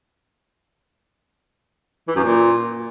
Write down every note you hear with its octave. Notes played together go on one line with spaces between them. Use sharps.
E3
F#2
A#2